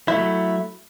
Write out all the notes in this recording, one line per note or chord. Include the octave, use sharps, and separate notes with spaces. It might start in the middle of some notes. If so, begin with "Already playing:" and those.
F#3 A3 E4